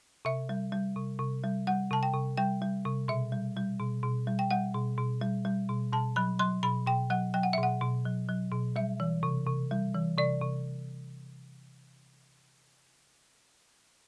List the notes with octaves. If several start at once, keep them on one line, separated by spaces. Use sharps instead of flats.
C3 E5
G3
G3
C3
C3
G3
G3 F#5
C3 A5
G5
C3
G3 G5
G3
C3
B2 E5
G3
G3
B2
B2
G3
G5
G3 F#5
B2
B2
G3
G3
B2
B2 A5
F#3 B5
F#3 C6
B2 B5
B2 G5
F#3 F#5
F#3 G5
F#5
E5
B2
F#5
B2
F#3
F#3
B2
G3 E5
E3
C3
C3
G3
E3
C3 D5
C3